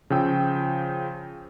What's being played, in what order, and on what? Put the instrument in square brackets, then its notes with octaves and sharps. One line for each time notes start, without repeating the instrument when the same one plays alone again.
[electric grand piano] C#3 F3 G5 E6